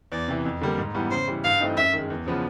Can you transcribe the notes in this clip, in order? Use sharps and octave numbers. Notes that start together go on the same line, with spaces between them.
E2 D5
C3 E3
F2
D3 G3 A#3
G#2
E3 G3 B3
C#3 C5
E3 G3
G2 F5
E3 A3 C4 D#4
F#2 E5
D#3 G#3
E2
C#3 F3 G#3 B3